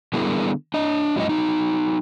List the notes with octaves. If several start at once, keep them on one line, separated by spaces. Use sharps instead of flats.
D3 G3 B3 E4 G#4 A#4
D4 D#5
F2 F#3 G#3 C#4 E4 D#5
F#3 D#4